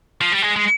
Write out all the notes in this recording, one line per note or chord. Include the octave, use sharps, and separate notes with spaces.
F3
G3
G#3
G#3